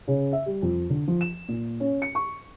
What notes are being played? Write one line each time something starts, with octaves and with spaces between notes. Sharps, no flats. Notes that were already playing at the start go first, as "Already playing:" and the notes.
C#3
E5
G3
F2
D3
F3
E7
A#2
C#4
C#7
C#6